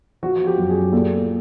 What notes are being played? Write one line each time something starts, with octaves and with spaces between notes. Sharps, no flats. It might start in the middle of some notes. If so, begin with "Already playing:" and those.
F3 F#4
G4
F#2
G#4
A#2 A4